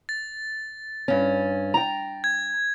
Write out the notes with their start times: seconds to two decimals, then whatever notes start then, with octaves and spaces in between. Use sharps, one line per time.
0.09 A6
1.08 G2 C#4
1.74 G5 A#5
2.24 G#6